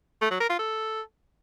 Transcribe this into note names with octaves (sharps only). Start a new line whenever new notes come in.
A3
F#3
A#4
F4
A4